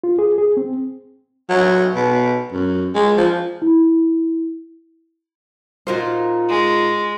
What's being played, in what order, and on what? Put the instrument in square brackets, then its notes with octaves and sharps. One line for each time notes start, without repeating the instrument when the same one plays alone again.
[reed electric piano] F4
G#4
G#4
C4
[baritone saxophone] F#3
B2
F#2
G#3
F3
[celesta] E4
[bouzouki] A#2 D#4 F4 [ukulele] F#4 A#4 C5
[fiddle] G#3